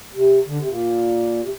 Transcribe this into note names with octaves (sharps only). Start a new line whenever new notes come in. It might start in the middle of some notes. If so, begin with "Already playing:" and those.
C3
D3
C3
A#2
C3